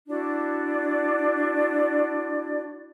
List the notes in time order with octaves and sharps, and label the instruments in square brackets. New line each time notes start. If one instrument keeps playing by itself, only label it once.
[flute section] D4 E4 F#4 D5